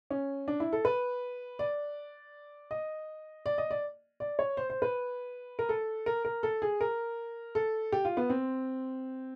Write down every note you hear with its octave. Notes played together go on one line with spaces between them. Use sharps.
C#4
D4
E4
A4
B4
D5
D#5
D5
D#5
D5
D5
C#5
C5
C5
B4
A#4
A4
A#4
A#4
A4
G#4
A#4
A4
G4
F4
B3
C4